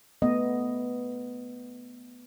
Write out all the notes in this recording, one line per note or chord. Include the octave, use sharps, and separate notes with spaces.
A3 B3 D#5